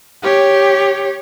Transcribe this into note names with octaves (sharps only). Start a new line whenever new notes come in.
G4 C#5